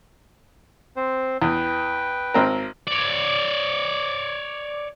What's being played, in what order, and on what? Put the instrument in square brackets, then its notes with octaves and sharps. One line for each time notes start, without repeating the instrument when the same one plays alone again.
[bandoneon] C4 C5
[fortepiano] E2 [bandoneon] B4 G5
[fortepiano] G#1 C4 A#4
[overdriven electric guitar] C#5 D5